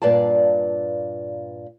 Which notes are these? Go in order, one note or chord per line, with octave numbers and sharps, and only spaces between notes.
G2 A#2 B4 D5 F5 A5